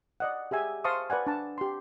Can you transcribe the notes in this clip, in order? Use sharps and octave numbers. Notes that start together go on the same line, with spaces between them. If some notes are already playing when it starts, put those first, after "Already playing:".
D5 D#5 F#5
G4 G#4 E5 G#5
C5 F5 A5 C6 C#6 D#6
B4 D5 F#5 G#5
D4 A5
G4 C6